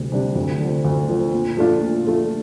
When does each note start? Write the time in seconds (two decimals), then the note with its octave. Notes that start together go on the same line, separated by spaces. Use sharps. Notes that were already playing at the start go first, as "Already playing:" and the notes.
Already playing: D2 C3 G3 D4
0.12 C3 G3 D4 G4
0.35 D2
0.60 D3 F3 C4
0.85 D2
1.08 D3 F3 C4
1.33 A#2
1.57 F3 A3 D4 F4
1.81 A#2
2.06 F3 A3 D4 F4